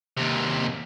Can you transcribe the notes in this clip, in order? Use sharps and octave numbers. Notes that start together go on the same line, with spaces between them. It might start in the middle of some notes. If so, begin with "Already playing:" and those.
D#2 C3